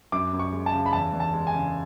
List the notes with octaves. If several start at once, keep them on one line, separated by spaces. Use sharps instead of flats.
F#2 D6
F#2
C#6
G#3
A5
C#3
B5
E2 A5
E2
A5
G#3
G#5
C#3